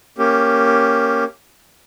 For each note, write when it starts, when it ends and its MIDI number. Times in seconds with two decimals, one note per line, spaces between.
0.18 1.24 58
0.18 1.24 61
0.18 1.24 67